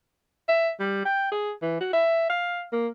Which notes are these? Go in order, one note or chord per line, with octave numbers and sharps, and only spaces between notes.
E5
G3
G5
G#4
E3
F#4
E5
F5
A#3